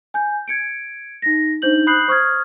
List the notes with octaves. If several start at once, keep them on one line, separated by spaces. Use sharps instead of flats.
G#5 G6
G#6 C#7 D7
D#4 A#6
D4 D#4 C5 G6 F#7
B5 D#6 F#6 G6 C7 F#7
C5 C#6 D#6 F6 G#6